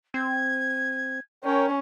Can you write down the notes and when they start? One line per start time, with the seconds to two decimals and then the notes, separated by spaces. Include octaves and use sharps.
0.14 C4 G#6
1.44 C#4 A#4 C#5 G5